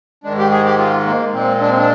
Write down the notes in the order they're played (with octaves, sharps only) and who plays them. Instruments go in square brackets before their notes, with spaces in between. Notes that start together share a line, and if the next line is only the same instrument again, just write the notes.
[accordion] G#2 D#3 G#3 D4
G4
G#4
G4
F4
A#3
A#2 G#3 C4
D4
C4
D4